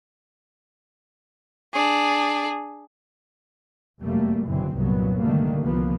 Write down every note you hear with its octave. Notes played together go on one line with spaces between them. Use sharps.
D4 G#4
F1 F#2 G3 A3 A#3
F#1 G2 B2 D3 E3 C4
C2 G2 A#2 F#3 A#3 B3
D3 D#3 G3 A3 A#3
C2 F3 A#3 B3